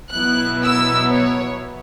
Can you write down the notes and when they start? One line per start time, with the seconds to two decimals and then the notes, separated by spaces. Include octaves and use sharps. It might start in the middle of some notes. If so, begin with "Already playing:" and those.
0.12 B2 F#3 B3 E4 F#6
0.62 E6
1.11 C#5